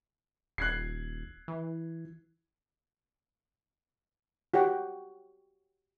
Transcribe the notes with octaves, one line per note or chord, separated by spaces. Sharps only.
D#1 F#6 G#6 C7
E3
F#4 G4 C#5 F#5 G5